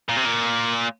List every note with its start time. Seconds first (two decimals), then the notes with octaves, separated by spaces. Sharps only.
0.09 A#2
0.17 C3
0.26 A#2